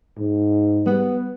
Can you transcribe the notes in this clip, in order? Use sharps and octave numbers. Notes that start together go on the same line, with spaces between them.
G#2
G3 B3